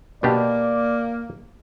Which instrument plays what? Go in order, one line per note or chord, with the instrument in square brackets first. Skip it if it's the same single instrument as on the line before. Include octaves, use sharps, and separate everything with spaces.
[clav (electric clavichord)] B2 D4 G4 [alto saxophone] A#3 [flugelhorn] D5